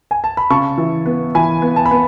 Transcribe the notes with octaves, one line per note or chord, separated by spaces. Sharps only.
G#5
A5
B5
C#3 A5 C#6
E3
B3
E3 G#5 B5
B3
A5
B5
B3